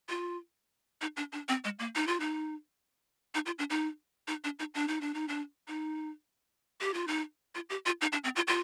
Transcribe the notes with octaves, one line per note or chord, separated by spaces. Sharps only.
F4
D#4
D4
D4
C4
G#3
A#3
D#4
F4
D#4
D#4
F4
D4
D#4
D#4
D4
D#4
D4
D#4
D4
D#4
D4
D#4
G4
F4
D#4
F4
G4
F4
D#4
D4
C4
F4
F4